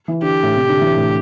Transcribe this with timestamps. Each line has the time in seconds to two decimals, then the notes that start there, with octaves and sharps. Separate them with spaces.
0.08 E3
0.22 D3 G4
0.43 A2
0.56 C3
0.69 D3
0.81 E3
0.97 A2